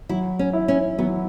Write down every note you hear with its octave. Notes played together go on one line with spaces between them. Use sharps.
F#3 E4
C#4
E4
C#4
F#3 B3